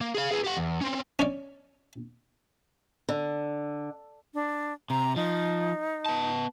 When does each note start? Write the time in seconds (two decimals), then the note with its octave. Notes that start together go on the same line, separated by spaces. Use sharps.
0.01 A#3
0.15 G#4 F5
0.32 G#4 B4
0.45 G4 F#5
0.58 E2
0.81 C4 C#4
1.19 C#4 C#5 D5
3.09 D3
4.34 D4
4.90 C3 A#5
5.16 F3 D#4
6.06 B3 A5